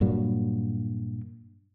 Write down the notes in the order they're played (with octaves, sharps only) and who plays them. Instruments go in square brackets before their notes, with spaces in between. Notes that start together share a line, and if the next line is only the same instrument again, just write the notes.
[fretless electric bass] G2 A#2 F#3